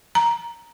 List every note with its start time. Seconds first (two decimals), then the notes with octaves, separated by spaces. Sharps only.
0.15 A#5